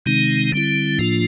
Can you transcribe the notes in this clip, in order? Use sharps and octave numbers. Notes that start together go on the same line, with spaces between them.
C3 D#3 G#3 C4 D#4
D3 G3 C4 E4
A2 F3 A#3 D4 F4